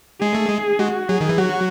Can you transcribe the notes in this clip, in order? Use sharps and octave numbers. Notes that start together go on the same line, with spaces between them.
G#3 G#4
A3
G#3
G#3 F#4
F#3 G#4
D#3
E3
F#3 F#4